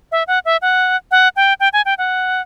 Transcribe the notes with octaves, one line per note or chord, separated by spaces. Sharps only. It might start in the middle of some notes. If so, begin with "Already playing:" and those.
E5
F#5
E5
F#5
F#5
G5
G5
G#5
G5
F#5